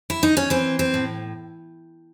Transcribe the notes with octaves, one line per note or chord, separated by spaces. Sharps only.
E4
D#4
C#4
E3 C4
C4
A2